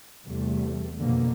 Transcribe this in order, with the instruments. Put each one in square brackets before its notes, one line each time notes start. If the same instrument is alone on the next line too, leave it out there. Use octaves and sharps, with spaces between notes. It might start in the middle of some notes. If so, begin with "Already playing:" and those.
[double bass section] E2 C3 G3 A3
F2 B2 D3 A#3